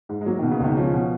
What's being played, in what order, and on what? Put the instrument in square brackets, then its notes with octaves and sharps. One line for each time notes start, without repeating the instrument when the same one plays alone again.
[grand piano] G#2
[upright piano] G#3
[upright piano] F#3 [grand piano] A#3
[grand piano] B2 [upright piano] D#3
[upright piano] C#3
[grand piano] C#2 [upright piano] D#3
[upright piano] F3 [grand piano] C#4
[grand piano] B2